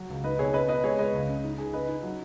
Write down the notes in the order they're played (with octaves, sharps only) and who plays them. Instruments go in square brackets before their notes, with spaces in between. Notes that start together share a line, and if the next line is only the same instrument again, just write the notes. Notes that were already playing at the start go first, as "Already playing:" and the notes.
Already playing: [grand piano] F#3 F#4
C#2
[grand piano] D#4 [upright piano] B4 D#5
[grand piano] B2 [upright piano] G#4 C#5
[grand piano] C#3 [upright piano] B4 D#5
[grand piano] B3 [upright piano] B4 D#5
[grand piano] G#3 [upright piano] G#4 C#5
[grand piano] G#3 [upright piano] B4 D#5
[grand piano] C#2
C#3
D#4
G#4
[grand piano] C#3 [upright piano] B4 D#5
[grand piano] D#4
F#3